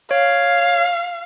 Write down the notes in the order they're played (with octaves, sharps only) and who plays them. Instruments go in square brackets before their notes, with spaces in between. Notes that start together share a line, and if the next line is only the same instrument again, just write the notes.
[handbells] C#5 [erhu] F5